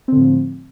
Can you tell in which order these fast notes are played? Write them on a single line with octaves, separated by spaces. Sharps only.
C4 D3 A2 F3